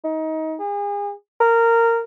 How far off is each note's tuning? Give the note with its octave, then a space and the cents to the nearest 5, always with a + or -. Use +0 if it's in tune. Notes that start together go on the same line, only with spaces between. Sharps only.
D#4 +25
G#4 -35
A#4 -15